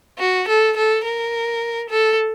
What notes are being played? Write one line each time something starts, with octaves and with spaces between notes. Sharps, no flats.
F#4
A4
A4
A#4
A4